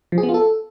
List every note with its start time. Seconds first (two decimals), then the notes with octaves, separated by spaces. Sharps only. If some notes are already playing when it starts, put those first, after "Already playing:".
0.12 F3
0.18 G#4
0.23 B3
0.29 F4
0.34 A4